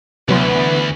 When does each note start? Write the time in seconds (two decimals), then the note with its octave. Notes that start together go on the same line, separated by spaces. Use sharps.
0.29 D2 C3 E3 F#3 B3 B4 C6